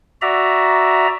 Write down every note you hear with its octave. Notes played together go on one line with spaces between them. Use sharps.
F#4 D5 E5 A#5